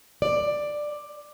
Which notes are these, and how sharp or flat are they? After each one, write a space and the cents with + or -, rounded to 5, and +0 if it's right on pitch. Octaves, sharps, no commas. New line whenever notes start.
D5 +10